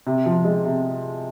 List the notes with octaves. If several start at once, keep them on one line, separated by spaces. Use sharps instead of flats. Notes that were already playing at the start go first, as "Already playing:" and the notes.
C3
F3
G#3
C3